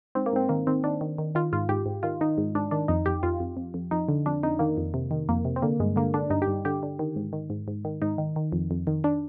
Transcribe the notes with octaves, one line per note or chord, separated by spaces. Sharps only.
G#2 C4
A#3
G#2 C4
D#3 A#3
D#3 C4
D#3 D4
D#3
D#3
D#3 F4
G#2 F4
G#2 G4
G#2
D#3 F4
D#3 D#4
G#2
G#2 D4
D#3 D4
F2 D#4
F2 G4
F2 F4
F2
F2
F2
F2 D#4
D3
F2 D4
F2 D#4
D#3 A#3
F2
C3
D#3
F2 A#3
C3
C4
D3 A#3
G2 G#3
D3 A#3
D3 D4
G2 D#4
G4
G2
D3 G4
D3
D#3
G#2
D#3
G#2
G#2
D#3
G#2 D#4
D#3
D#3
F2
F2
D#3
D4